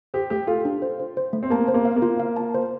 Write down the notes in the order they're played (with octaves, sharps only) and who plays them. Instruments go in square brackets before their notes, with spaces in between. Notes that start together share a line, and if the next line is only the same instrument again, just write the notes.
[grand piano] G4 [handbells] C5
[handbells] A3 [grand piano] G4
[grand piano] F4 [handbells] A4
[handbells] D4
C5
C5
C5
A3
[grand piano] C4
[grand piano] A#3 [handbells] A5
[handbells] C5
[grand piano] A#3
[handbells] F5
[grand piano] A#3
[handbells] F4
F5
A5
C5